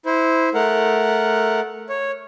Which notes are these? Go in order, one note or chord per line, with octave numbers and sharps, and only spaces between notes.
E4 C5
A3 A#4 F#5
C#5